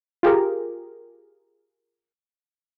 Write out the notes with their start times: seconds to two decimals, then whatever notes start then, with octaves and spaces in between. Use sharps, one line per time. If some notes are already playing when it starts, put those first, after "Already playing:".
0.23 F4 G4 G#4 A#4